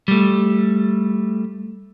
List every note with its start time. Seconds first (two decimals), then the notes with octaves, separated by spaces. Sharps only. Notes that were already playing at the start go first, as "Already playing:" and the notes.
0.08 G3 A3